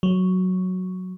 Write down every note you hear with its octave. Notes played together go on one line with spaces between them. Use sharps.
F#3